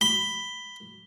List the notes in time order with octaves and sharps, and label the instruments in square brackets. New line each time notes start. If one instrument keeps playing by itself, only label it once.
[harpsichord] B5 [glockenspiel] G7